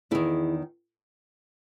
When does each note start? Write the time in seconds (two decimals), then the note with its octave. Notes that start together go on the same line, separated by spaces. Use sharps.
0.11 E2 D#3 E4 G#4